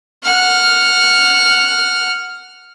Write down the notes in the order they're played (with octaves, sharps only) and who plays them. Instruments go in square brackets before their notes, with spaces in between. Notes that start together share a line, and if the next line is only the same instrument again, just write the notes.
[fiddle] F#5 F6